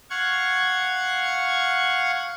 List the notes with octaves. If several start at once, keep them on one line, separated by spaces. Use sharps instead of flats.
F5 F#5 C#6 G#6